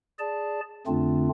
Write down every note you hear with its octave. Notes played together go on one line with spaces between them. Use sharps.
G#4 D5 A5
F2 D3 A3 C4 D4 F4